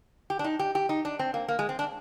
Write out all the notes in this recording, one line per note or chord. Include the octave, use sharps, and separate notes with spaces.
G4
D4
D#4
G4
G4
D#4
D4
C4
A#3
A#3
G#3
C4
D4